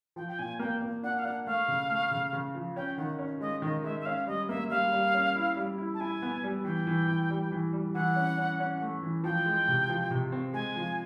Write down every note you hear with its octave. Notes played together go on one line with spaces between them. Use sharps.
F3 G5
G5
A#2 G#5
A#3 G5
A#3
D4 F#5
F5
D4 F#5
A3 F5
C#3
A3
C#3
C#3
F3
C#4 G5
D#3 F#5
C#4
G#3 D#5
D#3 D#5
G#3 E5
E5
C#4 F5
G3 D#5
A#3 E5
G3 F5
G3
C#4
E4
G3
E4
A5
E4 G#5
B3
G3
E3 G5
E3
E3
G3
E3
G3
E3 F#5
C#4
C#4
C#4
A3
E3
F3 G5
G#3
C3
F3
C3
C4
G#3 G#5
F3